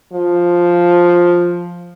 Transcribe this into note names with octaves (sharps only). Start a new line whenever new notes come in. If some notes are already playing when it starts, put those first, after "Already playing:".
F3